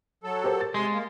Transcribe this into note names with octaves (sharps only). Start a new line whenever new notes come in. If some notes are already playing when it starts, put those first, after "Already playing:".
F#3 A4
G4 A#4 C5
A6
C3 G#3 C6
A#3